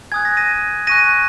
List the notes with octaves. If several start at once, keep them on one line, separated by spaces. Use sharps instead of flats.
G#5 D#6 F#6 G#6
A#6
A#6 D#7
G#5 C#6 F#6 A#6 D#7